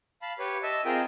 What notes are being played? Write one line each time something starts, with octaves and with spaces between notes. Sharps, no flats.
F5 A5 B5
G4 B4 C#5
D#5 E5 A5 E6
C4 F4 G#4 A#4 D#5 G5